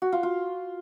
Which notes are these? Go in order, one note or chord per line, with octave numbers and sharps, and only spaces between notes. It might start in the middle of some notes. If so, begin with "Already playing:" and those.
F#4
F4
F4